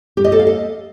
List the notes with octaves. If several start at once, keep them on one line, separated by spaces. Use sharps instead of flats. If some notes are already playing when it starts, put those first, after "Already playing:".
G4
D#5
A4
F5
D#5